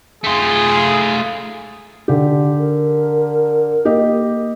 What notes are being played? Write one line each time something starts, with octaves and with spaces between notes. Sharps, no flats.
A3 F4 G#4
D3 G4
A#4
A#3 G4 D#5